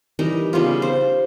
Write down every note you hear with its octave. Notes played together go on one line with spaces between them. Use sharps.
E3 G3 D#4 A#4
C#3 G3 B3 F4
C5